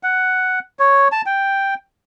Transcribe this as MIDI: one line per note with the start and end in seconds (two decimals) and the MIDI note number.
0.03 0.59 78
0.79 1.08 73
1.12 1.22 81
1.26 1.74 79